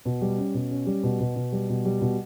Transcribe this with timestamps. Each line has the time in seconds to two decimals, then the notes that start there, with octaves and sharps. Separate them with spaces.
0.05 B2
0.21 G3
0.38 C#4
0.54 B2
0.71 C#4
0.87 G3
1.03 B2
1.20 B2
1.36 B2
1.52 G3
1.69 B2
1.85 G3
2.01 B2